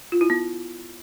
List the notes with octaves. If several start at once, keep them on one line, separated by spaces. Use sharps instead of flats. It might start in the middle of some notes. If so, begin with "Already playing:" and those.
F4
E4
B3